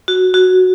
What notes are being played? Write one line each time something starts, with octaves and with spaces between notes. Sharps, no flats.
F#4
F#4